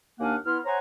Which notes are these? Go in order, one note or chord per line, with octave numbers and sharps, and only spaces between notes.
D#2 A#3 D4 F5 F#5 G#5
B3 E4 C6 F6
C5 C#5 F#5 G#5 A#5